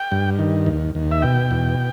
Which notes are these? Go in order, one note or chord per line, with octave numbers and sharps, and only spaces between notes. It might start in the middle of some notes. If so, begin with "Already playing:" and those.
Already playing: G5
G2
D#3
D#2
D#2
E5
B2 G5
E2